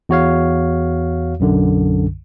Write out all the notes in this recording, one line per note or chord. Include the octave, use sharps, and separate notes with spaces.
E2 F#4 C#5 F5
B1 F#2 D3